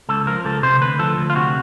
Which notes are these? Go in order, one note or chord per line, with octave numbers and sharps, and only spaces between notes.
C#2 A4
F3 A#4
C#2 A4
C3 C5
D2 B4
F3 A4
D2
F4
C3 F#4